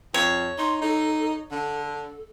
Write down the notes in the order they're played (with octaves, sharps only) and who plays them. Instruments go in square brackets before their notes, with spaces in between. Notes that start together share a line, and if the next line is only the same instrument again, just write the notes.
[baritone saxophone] F2 [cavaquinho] C#5
[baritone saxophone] D#4 [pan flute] C6
[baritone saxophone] D#4 [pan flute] A4
[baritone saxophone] D3 [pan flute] A4